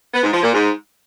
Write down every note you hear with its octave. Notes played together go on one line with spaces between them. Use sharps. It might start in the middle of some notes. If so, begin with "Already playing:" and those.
B3
G#2
F3
A#2
G#2